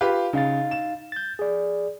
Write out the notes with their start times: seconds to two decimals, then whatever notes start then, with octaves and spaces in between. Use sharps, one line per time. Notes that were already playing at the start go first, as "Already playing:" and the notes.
0.01 F4 G4 B4
0.33 C#3 D#4 F5 A6
0.71 E7
1.12 G6 A6
1.39 G#4 D5